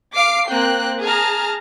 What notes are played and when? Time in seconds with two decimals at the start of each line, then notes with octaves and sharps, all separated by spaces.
0.14 F5 D6 C7 D7
0.51 A#3 C4 G5 F#6
1.04 G#4 A5 A#5 F6